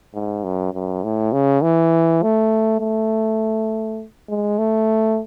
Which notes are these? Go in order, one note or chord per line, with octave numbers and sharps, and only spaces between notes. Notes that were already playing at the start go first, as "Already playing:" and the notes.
G#2
F#2
F#2
A2
C#3
E3
A3
A3
G#3
A3